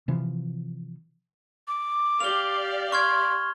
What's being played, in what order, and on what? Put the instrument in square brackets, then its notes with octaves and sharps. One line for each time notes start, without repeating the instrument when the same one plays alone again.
[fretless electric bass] C3 E3 F3
[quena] D6
[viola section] G4 D5 F5 [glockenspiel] F7 G7
[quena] C6 [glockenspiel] C#6 F6 G#6